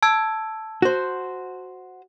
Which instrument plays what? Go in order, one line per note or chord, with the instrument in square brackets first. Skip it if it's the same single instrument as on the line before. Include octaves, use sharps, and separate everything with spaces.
[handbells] A5 E6 G#6
[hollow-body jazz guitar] F#4 C5